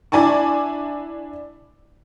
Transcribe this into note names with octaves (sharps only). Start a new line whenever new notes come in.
D4 E4 D5 G#5 A5 C#6